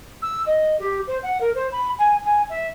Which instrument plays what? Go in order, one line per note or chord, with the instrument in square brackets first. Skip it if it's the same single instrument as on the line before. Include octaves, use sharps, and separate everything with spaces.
[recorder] E6
D#5
G4
C5
F#5
A#4
C5
B5
G#5
G#5
E5